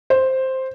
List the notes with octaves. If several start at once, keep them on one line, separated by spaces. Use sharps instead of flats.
C5